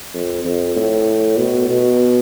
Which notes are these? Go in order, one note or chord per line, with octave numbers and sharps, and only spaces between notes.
F2
F2
A2
B2
B2